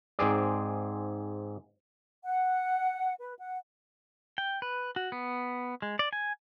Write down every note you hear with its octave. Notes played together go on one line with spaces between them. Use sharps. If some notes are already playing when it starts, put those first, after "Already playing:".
G#2 C4 G#4 D5
F#5
B4
F#5
G5
B4
F#4
B3
G#3
D5
G#5